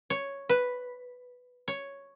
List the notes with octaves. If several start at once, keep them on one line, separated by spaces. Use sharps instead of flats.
C#5
B4
C#5